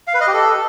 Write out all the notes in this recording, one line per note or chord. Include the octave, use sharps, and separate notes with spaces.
F5
B4
D#5
G4
A4